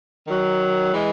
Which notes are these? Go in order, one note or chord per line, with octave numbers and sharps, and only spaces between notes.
D#3 F#3
E3 G#3